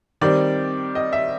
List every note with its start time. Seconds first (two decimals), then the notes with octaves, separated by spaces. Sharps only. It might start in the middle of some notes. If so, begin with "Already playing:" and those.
0.21 D#3 G3 C4 D5
0.95 D#5
1.13 E5